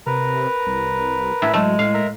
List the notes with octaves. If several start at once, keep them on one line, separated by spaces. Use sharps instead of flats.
C3 A#4 B4 A#5
C2
A2 E5
F#3 G#3 A3
A2 F5
A#4 E5 A#5